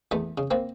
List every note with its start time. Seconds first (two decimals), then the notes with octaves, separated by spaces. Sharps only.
0.11 E2 A3 B3
0.38 C#3
0.51 A#3 C4